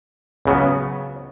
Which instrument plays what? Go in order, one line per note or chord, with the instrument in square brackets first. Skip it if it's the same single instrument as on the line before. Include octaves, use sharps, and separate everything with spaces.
[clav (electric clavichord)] C#2 C#3 F#3 B3